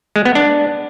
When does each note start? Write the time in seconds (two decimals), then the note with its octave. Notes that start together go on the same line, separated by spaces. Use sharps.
0.16 G#3
0.25 B3
0.35 D4